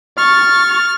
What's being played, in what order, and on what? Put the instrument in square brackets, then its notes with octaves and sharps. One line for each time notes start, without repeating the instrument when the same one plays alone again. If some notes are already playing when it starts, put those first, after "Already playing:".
[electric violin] C#6 A6 [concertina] F6